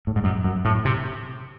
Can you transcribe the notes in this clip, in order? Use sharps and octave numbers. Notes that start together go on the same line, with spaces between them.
A2
G#2
F#2
F#2
A2
C3